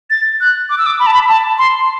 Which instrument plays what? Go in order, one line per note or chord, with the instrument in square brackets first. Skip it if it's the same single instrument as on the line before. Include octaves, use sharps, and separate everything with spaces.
[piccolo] A6
F#6
D6
E6
D6
B5
A5
B5
A5
C6